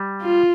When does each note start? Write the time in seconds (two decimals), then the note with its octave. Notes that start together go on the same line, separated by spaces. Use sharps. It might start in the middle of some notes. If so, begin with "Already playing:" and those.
Already playing: G3
0.22 F4